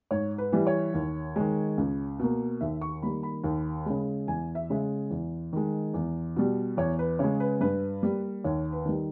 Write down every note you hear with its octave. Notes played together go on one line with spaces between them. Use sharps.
G#2 C#5
B4
E3 G3
C#5
D#2
D#3 G#3
C#2
B2 A#3
D#2 E5
C#6
D#3 G3 A#3 B5
B5
D#2
C#3 G#3
E2 G#5
E5
C#3 G#3
E2
D#3 G#3
E2
B2 G3
E2 C#5
B4
C#3 G#3 C#5
B4
G2 B4
G3 A#3
D#2 C#5
B4
D#3 G3